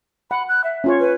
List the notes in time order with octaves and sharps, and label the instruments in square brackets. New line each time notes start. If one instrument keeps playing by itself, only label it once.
[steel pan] F#5 [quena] B5
[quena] F#6
E5
[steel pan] C#4 F4 C#5
[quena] B4